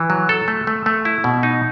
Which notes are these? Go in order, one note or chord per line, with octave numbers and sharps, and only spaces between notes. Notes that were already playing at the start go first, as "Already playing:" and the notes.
Already playing: E3
F#3
A4
A3
A3
A3
E4
B2
D#4